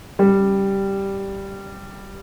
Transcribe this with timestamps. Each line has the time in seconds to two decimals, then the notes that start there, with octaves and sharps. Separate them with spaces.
0.19 G3